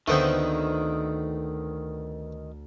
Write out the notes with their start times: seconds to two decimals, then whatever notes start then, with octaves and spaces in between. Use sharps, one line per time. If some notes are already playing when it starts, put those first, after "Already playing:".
0.08 D2 D#3 A3 B3 C4 C5 G6